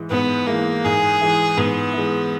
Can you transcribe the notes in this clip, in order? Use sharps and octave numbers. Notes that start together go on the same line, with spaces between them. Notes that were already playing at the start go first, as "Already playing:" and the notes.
Already playing: G#2 E3 G#3
G#2 B3
E3 G#3 A#3
G#2 G#4
E3 G#3
G#2 B3
E3 G#3